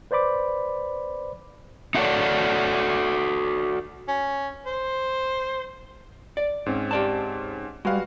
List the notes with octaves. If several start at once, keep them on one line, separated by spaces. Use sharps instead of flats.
B4 C5 D5 B5 D6
D#4 E4 F#4 A4 C#5 D5
C#4
C5
D5
G#2 C4 C#4
G4 D5 A5
G3 G#3 F#4 B4 F5